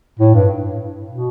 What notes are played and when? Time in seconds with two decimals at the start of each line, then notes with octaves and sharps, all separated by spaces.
0.19 A2
0.34 G2
1.09 B2